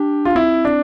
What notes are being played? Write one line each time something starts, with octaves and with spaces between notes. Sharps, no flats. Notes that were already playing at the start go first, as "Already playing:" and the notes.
Already playing: D4 G4
F4
C4 E4
D4